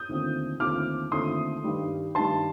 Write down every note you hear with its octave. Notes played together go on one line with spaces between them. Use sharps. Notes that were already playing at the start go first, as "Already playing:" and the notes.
Already playing: D#6 G6
D#2 D3 A3 C4 F4
D#2 D3 A3 C4 F4 D6 F6
D#2 D3 A3 C4 F4 C6 D#6
G2 D#3 G3
G2 D#3 G3 A5 C6